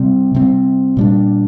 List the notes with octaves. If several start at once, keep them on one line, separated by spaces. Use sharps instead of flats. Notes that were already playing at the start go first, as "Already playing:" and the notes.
Already playing: C3 G3 C4
C3 G3 C4
A#2 G3 D4